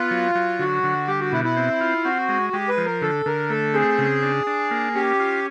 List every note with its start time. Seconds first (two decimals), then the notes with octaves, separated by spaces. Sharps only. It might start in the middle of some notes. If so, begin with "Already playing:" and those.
Already playing: B3 F4
0.11 F#3
0.35 F#3
0.59 D3 F#4
0.83 D3
1.08 G3 G4
1.20 F#4
1.32 B2 E4
1.44 E4
1.57 C4
1.81 F4
2.05 C4 F#4
2.29 G#3
2.53 G#3 G4
2.69 B4
2.77 F3
2.86 A#4
3.02 D3 A4
3.26 D3 A#4
3.50 A3 A4
3.74 C4 G#4
3.98 C#3
4.23 D4
4.47 D4
4.71 A#3
4.95 C#4 G4
5.20 F4